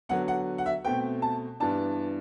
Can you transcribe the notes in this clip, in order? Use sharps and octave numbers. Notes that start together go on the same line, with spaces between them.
D3 F#3 B3 F#5
F#5
F#5
E5
B2 A3 C4 G5
A5
G2 E3 B3 D4 A5